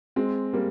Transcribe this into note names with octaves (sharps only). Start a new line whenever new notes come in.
G#3 C4
G3 A#3